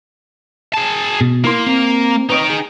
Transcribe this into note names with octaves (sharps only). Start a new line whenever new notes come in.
G#4 A5
B2
A#3 E4 A#4 C6
C4
D#4 B4 C#5 D#5 G5
G#4